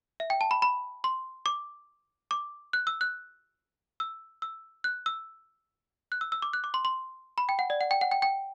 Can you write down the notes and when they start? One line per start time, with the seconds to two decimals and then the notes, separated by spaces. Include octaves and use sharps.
0.20 E5
0.30 G5
0.41 A5
0.51 B5
0.62 B5
1.04 C6
1.46 D6
2.31 D6
2.73 F#6
2.87 E6
3.01 F#6
4.00 E6
4.42 E6
4.84 F#6
5.06 E6
6.12 F#6
6.21 E6
6.32 E6
6.42 D6
6.53 F#6
6.64 D6
6.74 C6
6.85 C6
7.38 B5
7.49 G5
7.59 F#5
7.70 D5
7.81 F#5
7.91 G5
8.01 F#5
8.11 G5
8.22 G5